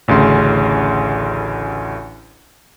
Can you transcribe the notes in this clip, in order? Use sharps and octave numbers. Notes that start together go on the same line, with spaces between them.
A1 D2 C#3 C6